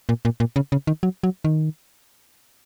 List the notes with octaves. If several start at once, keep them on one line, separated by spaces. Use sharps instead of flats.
A#2
A#2
A#2
C#3
C#3
D#3
F#3
F#3
D#3